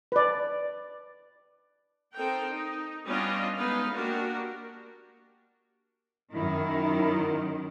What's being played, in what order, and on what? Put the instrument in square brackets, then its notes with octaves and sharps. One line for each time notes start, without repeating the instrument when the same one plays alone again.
[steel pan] B4 D5
[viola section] C4 D#4 A4 A#4 G5
D#4
G3 B3 C#4 D4 F4 D#5
G#3 B3 D#4 B4 F5
A#3 D4 F#4 G4 A#4
[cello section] F#2 D#3 [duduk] E4